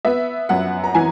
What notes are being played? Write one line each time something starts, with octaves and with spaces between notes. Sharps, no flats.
B3 E5
F#2 F#5
A#5
E3 G#5